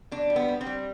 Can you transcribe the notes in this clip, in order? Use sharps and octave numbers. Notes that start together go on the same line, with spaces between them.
B2 D4
G3
B3
G3
C4
G3